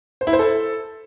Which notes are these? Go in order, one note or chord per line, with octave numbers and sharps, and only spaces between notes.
C5
E4
C5
A4